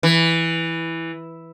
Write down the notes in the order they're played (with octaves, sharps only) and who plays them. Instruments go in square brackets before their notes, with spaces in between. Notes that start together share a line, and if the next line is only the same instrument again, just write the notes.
[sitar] E3